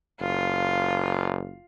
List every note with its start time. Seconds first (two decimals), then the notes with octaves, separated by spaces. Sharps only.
0.21 F#1 F4